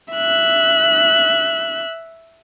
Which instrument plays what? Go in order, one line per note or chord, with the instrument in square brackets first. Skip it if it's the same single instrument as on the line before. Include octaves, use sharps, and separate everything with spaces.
[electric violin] E5 F#6